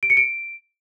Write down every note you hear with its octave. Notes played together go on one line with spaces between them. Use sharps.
D7
C#7
D7